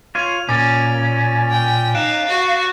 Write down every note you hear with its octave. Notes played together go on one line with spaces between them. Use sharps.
F4 C#5 D#7 F7
A#2 C#4 D6 A6 D7
G5
D#4 F5 F#6 D7 E7
F#4